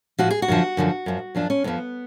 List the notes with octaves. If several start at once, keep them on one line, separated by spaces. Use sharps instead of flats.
A2 F3 F#4
G#4
F#4
F#2 D3 F3
F#2 D3 F3
F#2 F3
F#2 F3 D4
C#4
F2 F3 B3